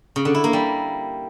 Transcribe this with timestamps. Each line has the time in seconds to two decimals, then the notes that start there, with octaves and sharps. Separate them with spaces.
0.16 C#3
0.25 D3
0.35 E4
0.44 A#3
0.53 G3